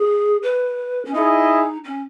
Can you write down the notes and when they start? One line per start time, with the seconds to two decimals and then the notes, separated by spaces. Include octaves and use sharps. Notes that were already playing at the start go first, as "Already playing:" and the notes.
Already playing: G#4
0.43 B4
1.05 C#4
1.14 D#4 E4 G#4 D#5
1.84 C#4